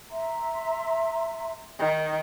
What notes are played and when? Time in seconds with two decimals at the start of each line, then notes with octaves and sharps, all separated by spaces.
0.11 E5 A#5 C6
1.79 D#3